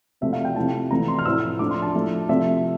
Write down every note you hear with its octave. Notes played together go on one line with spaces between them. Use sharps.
C3 F3 A3 E5
F5
G5
C3 F3 A3 E4 A5
C3 E3 A3 E4 A#5
C6
F6
A2 F3 C4 E4 E6
F3 A3 D4 D6
C6
A5
F3 A3 E4
C3 F3 A3 C4 E5